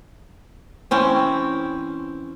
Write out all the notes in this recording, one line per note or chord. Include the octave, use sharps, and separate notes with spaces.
E3 C4 C#4